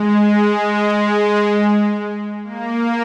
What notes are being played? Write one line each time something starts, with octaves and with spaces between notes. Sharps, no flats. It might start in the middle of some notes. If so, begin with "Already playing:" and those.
Already playing: G#3
G#3
A#3